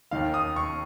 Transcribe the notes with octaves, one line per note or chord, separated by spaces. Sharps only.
D#2 D#3 F5
D#6
C#6